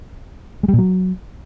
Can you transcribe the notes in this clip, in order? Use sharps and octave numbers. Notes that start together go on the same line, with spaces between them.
G#3
G3
A#2
F#3